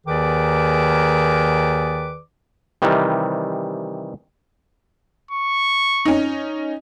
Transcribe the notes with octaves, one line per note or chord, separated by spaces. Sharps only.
D#2 D#3 G#4 B4 D5 D6
C3 D#3 E3 G3
C#6
C#4 D#4